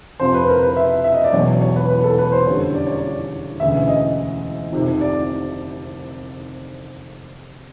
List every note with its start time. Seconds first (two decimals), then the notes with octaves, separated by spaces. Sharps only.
0.20 F2 C3 F3 C5
0.35 B4
0.48 A#4
0.63 B4
0.77 E5
1.04 E5
1.14 D#5
1.24 D5
1.33 E1 E2 B2 F#3 C#5
1.61 C#5
1.76 B4
1.90 B4
2.04 A4
2.18 B4
2.32 C5
2.46 F#1 F2 D3 G3 C#5
2.74 D5
2.87 C#5
2.98 D5
3.59 E1 D2 C#3 E3 E5
3.88 D#5
4.72 F1 F2 C3 D#3
5.01 D5